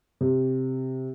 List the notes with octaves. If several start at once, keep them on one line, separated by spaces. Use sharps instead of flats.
C3